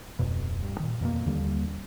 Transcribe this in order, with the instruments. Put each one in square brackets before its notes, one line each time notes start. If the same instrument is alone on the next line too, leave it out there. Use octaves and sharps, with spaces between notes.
[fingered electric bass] D1 F2 B2
G2
A#2 D#3
F2 B2 F#3 A#3
D#2 D3 G3 A#3